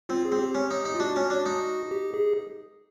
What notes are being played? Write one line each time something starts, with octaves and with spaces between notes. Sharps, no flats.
C4 F4
G#4
C4
G4
C#4
D#4
D#4
F4
D4 F#4
C#4
D4
D#4
G4
G#4